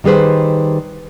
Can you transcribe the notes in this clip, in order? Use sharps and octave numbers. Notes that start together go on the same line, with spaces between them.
D#3 G3 G#4 B4 C5